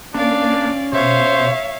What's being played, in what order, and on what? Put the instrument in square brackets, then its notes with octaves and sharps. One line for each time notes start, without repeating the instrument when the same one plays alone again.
[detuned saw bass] A#3 [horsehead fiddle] C#4 [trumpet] D4 [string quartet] D5 F5
[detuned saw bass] B2 [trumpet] C5 [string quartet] C#5 E5 F5